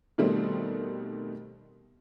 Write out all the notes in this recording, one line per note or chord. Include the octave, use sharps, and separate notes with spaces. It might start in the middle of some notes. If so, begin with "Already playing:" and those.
B2 D#3 G3 A3 C4